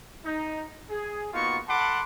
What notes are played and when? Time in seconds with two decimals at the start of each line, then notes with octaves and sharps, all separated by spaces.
0.25 D#4
0.90 G#4
1.34 A#3 B3 D#4 F4 F#4 C#6
1.69 A4 F#5 A5 B5 C6 D6